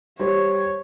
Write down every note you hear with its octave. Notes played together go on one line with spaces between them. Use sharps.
G3 C5 C#5